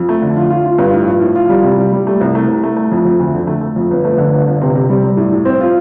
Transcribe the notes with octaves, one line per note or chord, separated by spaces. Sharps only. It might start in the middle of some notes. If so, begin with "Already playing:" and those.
Already playing: F2
A3
D3
F4
F4
F4
G2
A2
F3
A2
F4
G3
C3
G3
G3
A3
C2
A3
C2
A3
A3
F2
F2
D2
D3
A3
A3
F2
G1
A3
D3
G1
G1
C3
C3
G3
G3
A2
A2
C4
F4